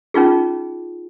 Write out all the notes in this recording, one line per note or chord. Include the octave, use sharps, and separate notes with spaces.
C#4 D#4 F4 G#4